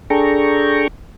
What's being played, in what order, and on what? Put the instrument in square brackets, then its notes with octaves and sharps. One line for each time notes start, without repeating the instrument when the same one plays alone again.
[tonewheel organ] D4 G#4 A4 G5 A#5 C#6